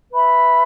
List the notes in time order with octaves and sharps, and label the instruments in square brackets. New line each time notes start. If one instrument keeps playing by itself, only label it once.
[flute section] B4 E5 B5